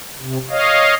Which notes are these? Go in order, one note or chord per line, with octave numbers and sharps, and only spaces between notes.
C3
C#5 D#5 F5